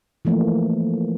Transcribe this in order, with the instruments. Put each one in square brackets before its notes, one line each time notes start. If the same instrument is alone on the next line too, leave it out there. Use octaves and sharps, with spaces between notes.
[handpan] E3 F3 A3 A#3